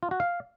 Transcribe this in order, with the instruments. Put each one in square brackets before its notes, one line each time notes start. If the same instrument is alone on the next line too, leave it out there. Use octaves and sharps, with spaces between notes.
[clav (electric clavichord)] F4
F#4
F5